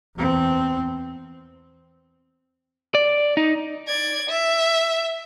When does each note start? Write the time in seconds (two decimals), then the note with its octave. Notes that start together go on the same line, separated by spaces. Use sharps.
0.16 E2 C4
2.95 D5
3.37 D#4
3.88 D5 G#6
4.29 E5